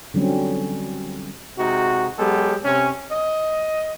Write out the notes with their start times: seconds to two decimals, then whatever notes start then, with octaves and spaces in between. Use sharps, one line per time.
0.14 D3 F#3 G3 C4 C#4
1.58 C3 G#3 D#4 F#4
2.18 F#3 G#3 B3 G4 A4
2.64 C3 C#4
3.11 D#5